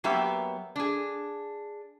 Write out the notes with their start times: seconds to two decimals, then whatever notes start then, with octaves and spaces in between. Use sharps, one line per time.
0.04 F#3 A#3 B3 G4 E5
0.76 D4 G#4